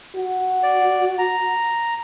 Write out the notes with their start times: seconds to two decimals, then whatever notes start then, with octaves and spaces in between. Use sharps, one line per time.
0.16 F#4
0.63 D5
1.19 A#5